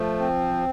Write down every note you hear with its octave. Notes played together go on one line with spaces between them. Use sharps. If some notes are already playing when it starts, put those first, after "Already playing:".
Already playing: F3 A3
C4